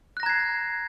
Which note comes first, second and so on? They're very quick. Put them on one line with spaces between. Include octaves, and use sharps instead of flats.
F#6 A#6 A#5 G#6 C7